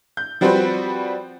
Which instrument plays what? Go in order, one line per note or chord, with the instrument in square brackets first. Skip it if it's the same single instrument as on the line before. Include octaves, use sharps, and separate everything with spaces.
[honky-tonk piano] G6
F3 G3 C4 F#4 B4 C5